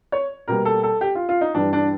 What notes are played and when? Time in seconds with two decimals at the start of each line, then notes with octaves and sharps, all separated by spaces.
0.12 C#5
0.48 B2 G3 A#3 A#4
0.65 A4
0.83 A4
1.01 G4
1.15 F4
1.29 F4
1.41 D#4
1.54 G2 E3 G3 D4
1.73 D4